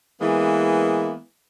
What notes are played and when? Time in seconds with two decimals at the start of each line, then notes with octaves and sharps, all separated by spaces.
0.20 E3 G#3 A#3 B3